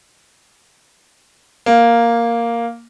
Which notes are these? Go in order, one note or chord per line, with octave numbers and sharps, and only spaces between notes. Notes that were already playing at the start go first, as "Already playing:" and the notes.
A#3